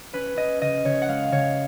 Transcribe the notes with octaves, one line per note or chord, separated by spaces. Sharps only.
C#4 B4
C#4 D#5
C#3 D#5
C#3 C#5
F#5
G#3 F5
C#3 C#5